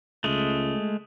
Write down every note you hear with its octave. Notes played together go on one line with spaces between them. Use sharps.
C#2 G#3 A3